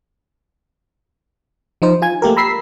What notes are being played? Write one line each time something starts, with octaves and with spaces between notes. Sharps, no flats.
F3 D#4 C5
F4 G#5 G#6
A3 A#3 G4 A#4
A#5 B5 E6 B6 C7